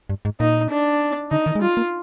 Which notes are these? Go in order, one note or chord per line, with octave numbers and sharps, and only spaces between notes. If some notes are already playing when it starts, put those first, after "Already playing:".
G2
G#2
A#2 D#4
D4
D3 D#4
D#3
G#3
G3 F4
A#3